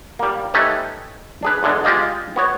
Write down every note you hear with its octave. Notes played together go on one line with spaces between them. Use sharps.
G3 A#3
A3 C#4 D#4 G4 B4 C#5
D4 G#4 B4
E2 D3 G#3
G#3 F4 G4 D5 D#5 F5
B3 F#4 C#5